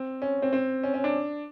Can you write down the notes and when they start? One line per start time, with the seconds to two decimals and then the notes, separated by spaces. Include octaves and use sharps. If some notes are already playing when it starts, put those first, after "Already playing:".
Already playing: C4
0.22 C#4
0.42 C4
0.53 C4
0.83 C#4
0.94 C#4
1.04 D4